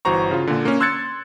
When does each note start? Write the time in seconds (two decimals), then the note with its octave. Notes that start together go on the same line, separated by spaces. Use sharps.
0.05 G1 E3 F#4 C5 A#5 C#6
0.31 C#3 F4
0.47 A#2 D3
0.65 A#3 C#4
0.80 C6 E6 F#6 G#6 A6 C#7